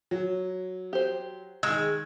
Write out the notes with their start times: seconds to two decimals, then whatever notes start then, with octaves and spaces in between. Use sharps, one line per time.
0.11 F#3
0.93 G4 C5
1.63 D#3 G#3 E6